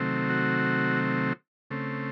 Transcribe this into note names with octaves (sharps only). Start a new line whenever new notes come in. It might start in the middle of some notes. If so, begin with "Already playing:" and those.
Already playing: C3 D#3 F#3 A3 C4
F#4
C#3 A3 C4